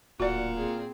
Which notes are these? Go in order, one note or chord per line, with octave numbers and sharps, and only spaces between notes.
D1 A#2 F#4 D5 F#5
C4 G#4